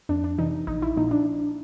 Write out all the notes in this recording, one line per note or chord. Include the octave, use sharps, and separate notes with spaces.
F2 D4
D4
C3 E3 D#4
A#1 D#4
E4
A#2 F3 D#4
D4